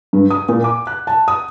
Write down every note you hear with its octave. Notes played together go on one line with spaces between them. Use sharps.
G2
D#6
A#2
D6
F#6
A5
D#6